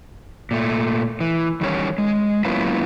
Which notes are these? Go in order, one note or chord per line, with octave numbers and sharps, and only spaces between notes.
A#2 A3
E3
E2 D#3 G3 C#4 D#4 C#5
G#3
F#3 A#3 B3 C#4 E4 F4